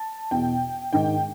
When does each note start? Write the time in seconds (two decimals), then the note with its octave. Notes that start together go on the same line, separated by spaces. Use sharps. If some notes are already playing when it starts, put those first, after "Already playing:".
Already playing: A5
0.31 E2 B2 G5
0.93 G#2 D#3 G5